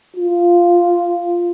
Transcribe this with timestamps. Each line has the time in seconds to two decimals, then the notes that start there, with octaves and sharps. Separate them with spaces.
0.16 F4